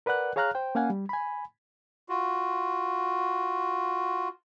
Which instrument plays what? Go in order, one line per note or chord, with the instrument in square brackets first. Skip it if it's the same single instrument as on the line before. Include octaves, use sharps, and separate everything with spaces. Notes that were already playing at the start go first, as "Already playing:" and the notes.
[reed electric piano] A#4 B4 D5 F#5 F#6
G#4 C#5 F5 A#5 F6 F#6
C5 G5
A#3 C#4 F5 F#5 G#5
G3
G#5 B5
[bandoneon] F4 F#4